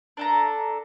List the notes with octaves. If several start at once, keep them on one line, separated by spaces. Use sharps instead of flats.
D4 A4 A#5